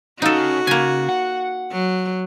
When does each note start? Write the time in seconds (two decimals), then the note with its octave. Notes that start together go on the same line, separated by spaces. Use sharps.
0.22 C#3 D#4 F#4 A4 F5
0.67 C#3 A#3 G#5
1.09 F#5
1.72 F#3